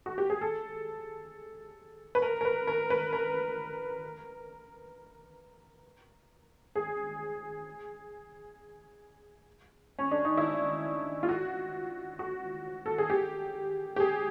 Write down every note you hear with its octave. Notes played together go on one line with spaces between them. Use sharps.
F#4
G4
G#4
A4
B4
A#4
A#4
B4
A#4
B4
A#4
G#4
C#4
D4
D#4
E4
F4
F#4
F#4
A4
G#4
G4
G4
G#4